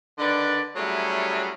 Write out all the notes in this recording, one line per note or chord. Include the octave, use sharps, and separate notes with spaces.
D3 D#3 D4 B4 D5
F#3 G3 A3 C#4 E4 G#4